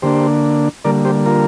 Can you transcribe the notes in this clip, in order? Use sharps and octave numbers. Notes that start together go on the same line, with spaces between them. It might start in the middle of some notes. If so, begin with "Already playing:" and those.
D3 A#3 D4 G4 C5
D3 G3 A#3 A#4 D5
G4 C5
F4 A#4